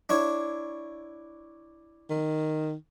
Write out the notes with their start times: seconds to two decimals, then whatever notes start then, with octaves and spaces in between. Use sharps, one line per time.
0.09 D4 E4 C#5
2.10 D#3